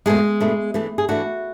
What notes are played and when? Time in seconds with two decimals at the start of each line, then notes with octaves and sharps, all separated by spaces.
0.06 B2 G#3 A3 D4 G#4
0.40 B2 A3 D4
0.74 E3 A3 D4
0.98 G#4
1.08 E3 A3 D4 F#4